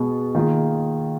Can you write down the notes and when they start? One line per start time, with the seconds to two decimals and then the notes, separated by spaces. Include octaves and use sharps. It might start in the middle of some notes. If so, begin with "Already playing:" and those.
Already playing: B2 G#3 B3
0.35 D#3 A#3 F4 G#4